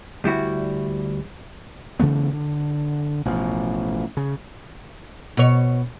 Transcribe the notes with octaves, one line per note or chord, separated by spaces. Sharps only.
D2 G3 E4 F#4
C#3 E3 A3 B3
D3
A1 B2 F3
C#3
B2 C#5